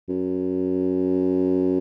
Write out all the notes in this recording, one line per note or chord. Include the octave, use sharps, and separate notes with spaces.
F#2